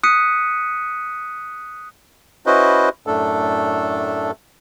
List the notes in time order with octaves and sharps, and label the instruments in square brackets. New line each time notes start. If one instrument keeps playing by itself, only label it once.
[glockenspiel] D#6 F#6 B6 C#7 D#7
[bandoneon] C#4 E4 F#4 B4 C5 D#5
F#2 A2 A3 D4 A4